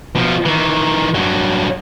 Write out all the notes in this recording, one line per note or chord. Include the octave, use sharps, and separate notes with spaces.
B2 F3
D#3 E3
G2 F#3